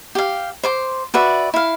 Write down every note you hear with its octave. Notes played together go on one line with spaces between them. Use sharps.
G4 F5
C5 C6 D6
F#4 B4 D5 E5
E4 F5